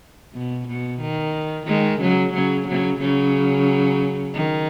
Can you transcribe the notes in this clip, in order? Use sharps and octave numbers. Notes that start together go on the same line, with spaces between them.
B2
B2
D#3
D#3 G#3
C#3 F#3
C#3 F#3
C#3 F#3
C#3 F#3
D#3